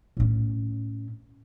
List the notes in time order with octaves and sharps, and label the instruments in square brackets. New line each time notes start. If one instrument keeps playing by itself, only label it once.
[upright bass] A2 C#4